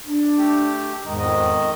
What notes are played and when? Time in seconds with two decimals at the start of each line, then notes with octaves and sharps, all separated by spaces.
0.05 D4
0.38 A3 G4
1.05 E2 G#2 D#3 G#3 D#4
1.19 F2 D#3 D#5